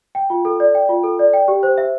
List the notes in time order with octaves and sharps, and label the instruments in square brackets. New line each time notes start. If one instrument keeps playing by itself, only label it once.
[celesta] G5
F4
A4
D5
G5
F4
A4
D5
G5
G4
C5
E5